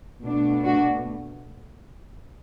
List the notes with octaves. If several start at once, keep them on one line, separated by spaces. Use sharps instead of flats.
B2 A3 D4
D4 F#4